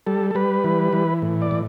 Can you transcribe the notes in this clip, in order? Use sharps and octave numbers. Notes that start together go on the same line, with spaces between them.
G3 A4
A4
G3 B4
E3
E3
A2
D5
A2